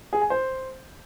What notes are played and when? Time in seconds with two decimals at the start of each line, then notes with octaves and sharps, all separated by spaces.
0.13 G#4
0.22 G#5
0.30 C5